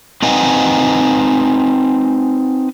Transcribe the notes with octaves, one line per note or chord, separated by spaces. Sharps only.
C4 D#4 B4 D#5 F#5 G#5